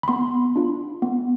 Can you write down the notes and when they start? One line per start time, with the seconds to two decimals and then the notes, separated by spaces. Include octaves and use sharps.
0.03 B5
0.08 B3 C6
0.56 D4 F4
1.02 B3